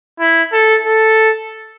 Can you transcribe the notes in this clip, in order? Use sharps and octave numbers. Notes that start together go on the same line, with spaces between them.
E4
A4
A4